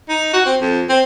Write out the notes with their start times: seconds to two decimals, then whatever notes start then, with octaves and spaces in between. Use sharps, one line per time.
0.09 D#4
0.33 F#4
0.46 C4
0.61 F2
0.89 C4